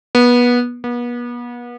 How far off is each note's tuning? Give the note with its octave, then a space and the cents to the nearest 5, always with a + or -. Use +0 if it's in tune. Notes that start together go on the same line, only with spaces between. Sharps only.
B3 -25
B3 -40